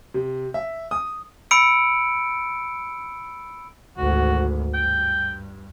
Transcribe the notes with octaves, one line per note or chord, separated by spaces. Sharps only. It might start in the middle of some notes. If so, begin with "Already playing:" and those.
C3
E5
D#6
B5 E6 C#7 D7
G#1 D2 F#4
G2 G5